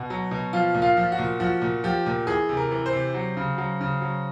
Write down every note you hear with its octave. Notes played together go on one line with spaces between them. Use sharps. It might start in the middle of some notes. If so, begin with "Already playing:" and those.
Already playing: B2 F#4
F#3
B2
F3 F4
A#2
F4
F3
F#4
A#2
F3 F#4
A#2
F3 G4
A#2
E3 G#4
C3
A#4
E3
C5
C3
F#3
C#3
F#3
C#3
F#3